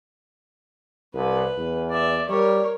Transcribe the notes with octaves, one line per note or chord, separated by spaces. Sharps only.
C2 B4
E2
D5 E5
G3 A#4 C#5